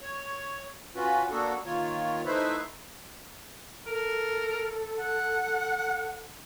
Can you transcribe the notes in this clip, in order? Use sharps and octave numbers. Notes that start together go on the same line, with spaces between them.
C#5
C#4 F4 F#4 B4
A#3 B3 D4 F#4 A4
D#3 A#3 F4 C#5
A3 D#4 E4 B4 C5 E5
A4 A#4
F#5